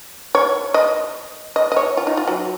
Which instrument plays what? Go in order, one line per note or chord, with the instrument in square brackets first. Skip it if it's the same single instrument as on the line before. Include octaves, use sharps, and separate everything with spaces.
[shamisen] C#5
D#5
D#5
D#5
C#5
F4
D#4
F4
F#3